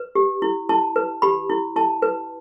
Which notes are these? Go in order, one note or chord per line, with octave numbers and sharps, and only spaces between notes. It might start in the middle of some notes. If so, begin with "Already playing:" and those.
Already playing: B4
G4
E4
E4 A5
B4
G4 B5
E4
E4 A5
B4